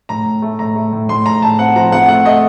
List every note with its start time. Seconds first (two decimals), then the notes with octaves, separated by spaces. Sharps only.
0.09 A2 A#5
0.26 A2
0.42 A3
0.59 A2 A#5
0.76 A3
0.93 A2
1.09 A2 C6
1.26 A2 A#5
1.42 A2 A5
1.59 C4 F#5
1.76 F3 A#5
1.92 C4 F#5
2.08 A3 F#5
2.25 A3 D#5